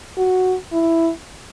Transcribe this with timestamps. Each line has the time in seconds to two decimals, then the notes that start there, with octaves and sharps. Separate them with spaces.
0.17 F#4
0.73 E4